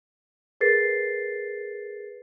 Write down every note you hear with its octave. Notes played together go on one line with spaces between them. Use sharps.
G#4 A#4 B4 A6 C7